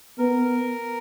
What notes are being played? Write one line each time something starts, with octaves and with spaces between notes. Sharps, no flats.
B3 A#4